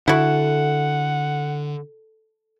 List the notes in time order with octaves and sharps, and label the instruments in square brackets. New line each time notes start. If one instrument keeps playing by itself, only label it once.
[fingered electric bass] D3 [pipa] E4 F#4 [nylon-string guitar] A4 [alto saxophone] F#5